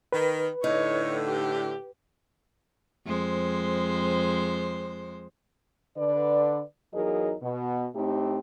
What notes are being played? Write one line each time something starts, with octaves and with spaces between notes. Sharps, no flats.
D#3 B4
A2 D3 D#4 C#5
G4
F2 G#3 C5
D3 B4 D5
E2 F#3 D#4 G#4 A#4 D#5
B2
A2 A3 C4 D#4 G4